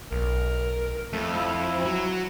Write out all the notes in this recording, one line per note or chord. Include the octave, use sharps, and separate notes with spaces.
B1 A#4
F2 A3
F3 E4
F#3